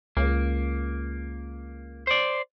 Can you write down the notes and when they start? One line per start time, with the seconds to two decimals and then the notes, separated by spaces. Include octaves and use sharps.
0.17 C#2 A#3
2.07 C5 D5